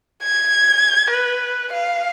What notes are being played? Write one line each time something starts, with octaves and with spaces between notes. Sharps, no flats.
G#6
B4
F5